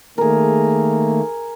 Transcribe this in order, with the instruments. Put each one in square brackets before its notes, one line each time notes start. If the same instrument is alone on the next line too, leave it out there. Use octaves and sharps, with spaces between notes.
[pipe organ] D#3 A3 A#3 [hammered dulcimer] G#4 A#4